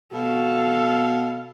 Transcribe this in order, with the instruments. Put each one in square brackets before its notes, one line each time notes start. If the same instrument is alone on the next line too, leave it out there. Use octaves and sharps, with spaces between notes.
[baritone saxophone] B2 [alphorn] F#4 [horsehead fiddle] A4 F5